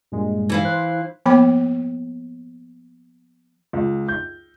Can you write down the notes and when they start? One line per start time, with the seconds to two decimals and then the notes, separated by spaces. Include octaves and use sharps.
0.12 G2 A#2 G#3
0.49 E3 E4 F5
0.64 C5 F#6
1.26 F3 A#3 B3 G5 B5 D6
3.73 C#2
4.08 G6